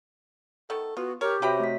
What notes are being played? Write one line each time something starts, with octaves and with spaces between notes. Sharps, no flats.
D#3 A3 B3 A4
B3 F4 F#4
G4 A#4 C#5
C3 F#4 B4 C#5 E5 G5 B5
A3 B6